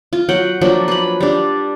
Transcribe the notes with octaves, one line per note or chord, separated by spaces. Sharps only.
F4
F#3 F#5 G5
F3 F#3 A#3 D4
B4 B5
G3 D4